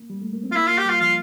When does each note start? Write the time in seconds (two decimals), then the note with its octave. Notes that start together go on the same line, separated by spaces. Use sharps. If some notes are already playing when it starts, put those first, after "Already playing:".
Already playing: A#3
0.10 G3
0.21 A3
0.33 A#3
0.44 C4
0.52 F4
0.55 A#3 E4
0.67 A#3 F4
0.78 G4
0.85 G3 F4
1.00 F3 F4